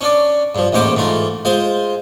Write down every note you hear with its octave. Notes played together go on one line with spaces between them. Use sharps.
C#4 D4 D5
G2 F3
A1 D#2 G#2 C#4 C5 D6
G#2 E3 A3 F4
G#3 F4 C5